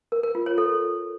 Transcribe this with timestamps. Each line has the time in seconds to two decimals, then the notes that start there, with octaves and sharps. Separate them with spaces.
0.12 A#4
0.23 A#4
0.35 F4
0.46 C#5
0.58 A4